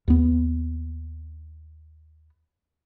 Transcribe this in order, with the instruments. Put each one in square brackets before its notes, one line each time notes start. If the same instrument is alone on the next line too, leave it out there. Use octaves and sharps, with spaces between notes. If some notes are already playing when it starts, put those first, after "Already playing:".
[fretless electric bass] D#2 B3